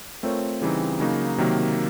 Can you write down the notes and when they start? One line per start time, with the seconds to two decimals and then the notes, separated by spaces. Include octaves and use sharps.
0.23 A3 C4 F4 A#4 C#5
0.61 C#3 E3 G3 C4 D#4
1.00 C#3 F#3 A#3 D#4 F#4
1.38 C3 D#3 F#3 A#3